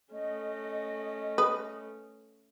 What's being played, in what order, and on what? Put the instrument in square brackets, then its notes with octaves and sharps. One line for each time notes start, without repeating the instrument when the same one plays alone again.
[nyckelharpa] A3 C#4 [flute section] D#5
[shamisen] B4 [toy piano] D#6